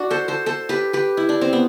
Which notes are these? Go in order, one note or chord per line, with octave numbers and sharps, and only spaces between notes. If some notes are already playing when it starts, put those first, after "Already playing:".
Already playing: D4 F#4
A4 C5
A4 C5
A4 C5
G4 B4
G4 B4
E4
D4
C4
B3